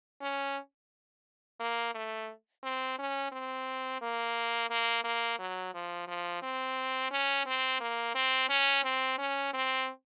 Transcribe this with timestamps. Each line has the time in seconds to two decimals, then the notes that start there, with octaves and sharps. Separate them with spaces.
0.22 C#4
1.60 A#3
1.95 A3
2.63 C4
2.98 C#4
3.32 C4
4.01 A#3
4.70 A#3
5.04 A#3
5.39 F#3
5.74 F3
6.08 F3
6.42 C4
7.11 C#4
7.46 C4
7.81 A#3
8.15 C4
8.50 C#4
8.84 C4
9.19 C#4
9.53 C4